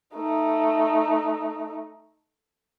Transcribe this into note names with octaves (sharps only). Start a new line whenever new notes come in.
A3 D#4